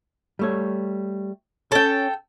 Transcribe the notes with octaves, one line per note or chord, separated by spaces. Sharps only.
G3 A3 C#5
C#4 A4 C#5 G5